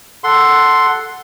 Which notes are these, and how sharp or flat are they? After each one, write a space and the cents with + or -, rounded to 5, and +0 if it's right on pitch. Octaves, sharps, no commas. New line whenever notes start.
A4 +0 F#5 +0 C6 +0